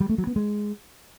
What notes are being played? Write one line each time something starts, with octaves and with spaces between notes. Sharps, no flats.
G3
A3
F#3
B3
G#3